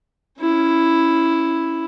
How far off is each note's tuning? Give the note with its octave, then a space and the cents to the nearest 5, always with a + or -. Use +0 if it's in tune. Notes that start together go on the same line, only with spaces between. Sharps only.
C#4 +0 E4 +0